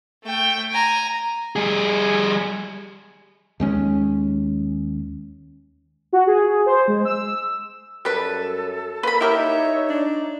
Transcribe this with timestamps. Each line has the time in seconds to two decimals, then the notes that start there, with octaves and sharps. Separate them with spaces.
0.24 A3 G5
0.71 G#5 A#5
1.56 G3 G#4
3.60 D#2 G#3 C#4
6.13 F#4
6.27 G#4
6.66 C5
6.88 G#3
7.05 E6
8.05 F#2 G3 A4 B4
9.03 A#3 B4 B5
9.21 E4 G4 A#4 C#5 E5
9.37 D#4
9.90 D4